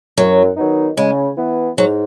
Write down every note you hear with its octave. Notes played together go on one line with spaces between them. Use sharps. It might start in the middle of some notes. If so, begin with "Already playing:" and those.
F#2 F#3
D#3 F#3 B3 D#4
C#3 G#3
E3 B3
G#2 F#3